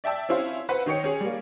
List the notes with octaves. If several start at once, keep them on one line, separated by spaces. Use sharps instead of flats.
D5 E5 G5 A5 E6
C4 C#4 E4 C5 F5
B4 C5 F#5 B5
D#3 D#4 C#5 G5 C#7
C#4 G#4
G3 A#3